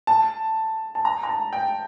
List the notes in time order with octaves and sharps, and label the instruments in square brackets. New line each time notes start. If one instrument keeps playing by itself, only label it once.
[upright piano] A5
A5
A#5
A#5
A5
G5